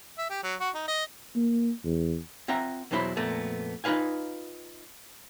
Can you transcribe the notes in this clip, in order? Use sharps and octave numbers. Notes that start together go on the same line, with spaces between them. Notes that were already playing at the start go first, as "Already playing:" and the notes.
E5
G4
F#3
F#4
D#4
D#5
A#3
E2
C4 F4 E5 F#5 A#5
E2 B2 F#3 E4 C5 B5
F2 A#2 A3 B3
D#4 F4 B4 F5 G#5